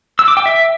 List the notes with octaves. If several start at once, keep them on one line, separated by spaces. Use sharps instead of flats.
E6
D6
G5
E5